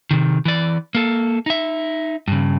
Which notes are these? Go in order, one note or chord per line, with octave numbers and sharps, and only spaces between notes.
C3 D#3
E3 D5
A#3 A4
D#4 E5
G2 C#3